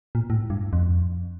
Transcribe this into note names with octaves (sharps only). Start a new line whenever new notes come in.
A#2
A2
G2
F2